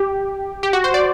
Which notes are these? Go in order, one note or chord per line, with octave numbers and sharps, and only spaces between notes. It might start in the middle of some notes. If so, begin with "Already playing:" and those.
Already playing: G4
G4
F#4
C5
D5